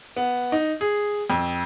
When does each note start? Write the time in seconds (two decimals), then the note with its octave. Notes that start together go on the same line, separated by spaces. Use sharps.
0.16 B3
0.52 D#4
0.81 G#4
1.30 F2